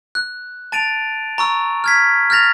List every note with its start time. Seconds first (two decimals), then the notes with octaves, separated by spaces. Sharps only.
0.15 F#6
0.72 A5 A6 D7 D#7 F7
1.38 A#5 C#6 E6
1.84 F6 G#6 B6
2.30 F6 G6 A6 A#6 F7